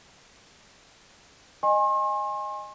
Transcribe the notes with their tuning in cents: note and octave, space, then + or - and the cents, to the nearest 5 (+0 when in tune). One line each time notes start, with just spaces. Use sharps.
D#5 -10 G#5 -15 C6 +45